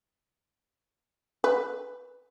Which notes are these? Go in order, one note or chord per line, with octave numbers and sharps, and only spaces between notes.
B4